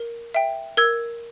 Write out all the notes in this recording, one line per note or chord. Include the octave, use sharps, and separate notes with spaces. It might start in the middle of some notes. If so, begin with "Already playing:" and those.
Already playing: A#4
E5 G5
A#4 E6 G#6